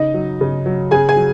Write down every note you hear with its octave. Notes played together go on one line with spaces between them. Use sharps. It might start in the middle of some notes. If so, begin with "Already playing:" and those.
Already playing: C#3 D#4 D#5
F#3
C#3
F#3
C#3 G#4 G#5
G#4 G#5
F#3